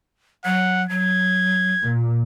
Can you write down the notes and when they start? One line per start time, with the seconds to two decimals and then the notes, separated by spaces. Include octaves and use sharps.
0.45 F#3 F#5
0.90 F#3 G#6
1.83 A#2